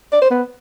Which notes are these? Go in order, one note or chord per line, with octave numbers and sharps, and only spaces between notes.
D5
C5
B3